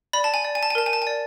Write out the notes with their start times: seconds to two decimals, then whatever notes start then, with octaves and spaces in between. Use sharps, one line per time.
0.13 D5 B5
0.24 A5
0.34 G#5
0.44 D5
0.55 G#5
0.63 A5
0.70 G#5
0.75 A#4 A5
0.86 G#5
0.93 A5
1.02 D5 G#5